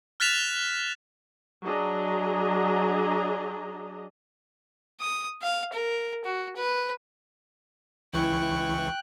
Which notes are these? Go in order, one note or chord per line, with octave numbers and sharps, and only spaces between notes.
F6 F#6 A6 B6 E7 F7
F#3 D4 G#4 D#5 A#5
D#6
F5
A#4
F#4
B4
C#2 E3 E4 G5 C#6 F#6